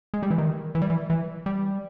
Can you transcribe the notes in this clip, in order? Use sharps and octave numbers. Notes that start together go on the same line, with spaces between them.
G#3
G3
E3
D#3
E3
G3
E3
E3
G3